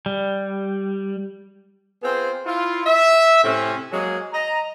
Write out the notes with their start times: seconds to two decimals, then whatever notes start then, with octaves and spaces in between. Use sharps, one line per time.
0.06 G3
2.03 B3 C4 F4 G#4 C5
2.46 E4 F4
2.85 E5
3.43 A2 C3 C4 C#4
3.92 F#3 G#3 A#3 G#4
4.33 D#5 A#5